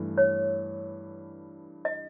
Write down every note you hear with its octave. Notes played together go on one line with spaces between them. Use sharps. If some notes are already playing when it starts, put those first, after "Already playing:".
Already playing: G2 E3 A3
C#5
D#5